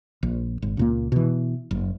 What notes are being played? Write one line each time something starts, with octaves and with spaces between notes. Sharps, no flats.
A#1
G#1
C#2 A#2 A#3
B2 E3
F#1